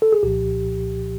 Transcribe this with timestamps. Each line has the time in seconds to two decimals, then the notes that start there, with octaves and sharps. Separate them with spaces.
0.02 A4
0.12 G#4
0.23 C2 A#2 F3 G4